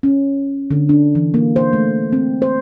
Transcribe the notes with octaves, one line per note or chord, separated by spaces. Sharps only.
C#4
D3
D4
E3
A#3
C5
A3
C4
C5